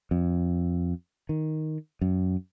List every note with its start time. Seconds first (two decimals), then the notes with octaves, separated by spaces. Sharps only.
0.11 F2
1.29 D#3
2.01 F#2